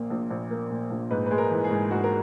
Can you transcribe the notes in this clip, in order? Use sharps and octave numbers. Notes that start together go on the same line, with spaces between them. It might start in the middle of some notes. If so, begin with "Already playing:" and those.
Already playing: A#1 A#2 A#3
A#1
A#1
A#3
A#2
A#1
G#2 B4
G#3 B4
A#4
E3
G#4
G#2
G#2 F#4
A#4